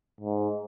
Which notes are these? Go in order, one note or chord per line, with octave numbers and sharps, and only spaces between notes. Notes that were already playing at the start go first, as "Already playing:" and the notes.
G#2